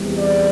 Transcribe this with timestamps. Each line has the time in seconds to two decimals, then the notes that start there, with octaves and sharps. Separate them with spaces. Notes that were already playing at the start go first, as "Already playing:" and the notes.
Already playing: E2 C3 G3
0.18 D5